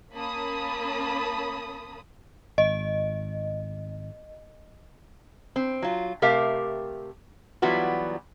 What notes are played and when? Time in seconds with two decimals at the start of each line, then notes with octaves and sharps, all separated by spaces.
0.14 A#3 C#4 A5 B5 D#6
2.58 G#1 D#5
5.56 C4
5.82 F#3 F4
6.22 C3 A3 G4 A#4 E5 F5
7.62 E3 F#3 G3 B3 F4 F#4